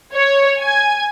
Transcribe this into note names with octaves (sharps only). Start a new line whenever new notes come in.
C#5
G#5